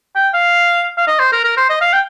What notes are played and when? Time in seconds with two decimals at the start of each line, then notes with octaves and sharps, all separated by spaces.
0.15 G5
0.34 F5
0.98 F5
1.07 D#5
1.19 C5
1.32 A#4
1.44 A#4
1.57 C5
1.69 D#5
1.81 F5
1.93 G5